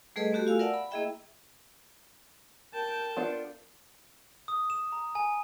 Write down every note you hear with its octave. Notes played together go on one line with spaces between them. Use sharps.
G3 A3 G#4 A4 B4 D#5
A3 B3 F#4 G4 A4
F4 F5 G#5 E6
A#4 D5 E5 F#5 A5
B5
A#3 E4 G#4 D#5 E5 G5
A#4 G5 A5
B3 D4 F4
D#6
E7
A#5
G#5